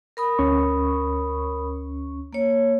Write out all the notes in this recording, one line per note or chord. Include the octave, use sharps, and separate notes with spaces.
A#4 B5 D#6
D2 C#4 C#6
A#3 C#5